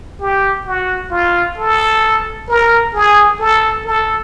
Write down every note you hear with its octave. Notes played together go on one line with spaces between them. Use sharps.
G4
F#4
F4
A4
A#4
G#4
A4
A4